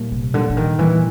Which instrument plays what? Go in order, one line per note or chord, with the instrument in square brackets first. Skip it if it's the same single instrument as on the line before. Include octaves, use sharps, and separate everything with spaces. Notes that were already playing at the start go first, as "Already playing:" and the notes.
Already playing: [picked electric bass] A#2 G3 A#3
[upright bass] C3
[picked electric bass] A#2 G3 A#3 [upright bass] D3
[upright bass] D3
D#3
[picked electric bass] A#2 G3 A#3 [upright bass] E3